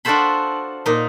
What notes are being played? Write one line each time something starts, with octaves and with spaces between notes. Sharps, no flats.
D4 F4 F#4 A4 C5 B5
A#2 D#4